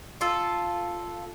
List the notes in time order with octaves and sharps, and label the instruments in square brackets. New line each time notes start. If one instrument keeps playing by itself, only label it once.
[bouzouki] F4 A4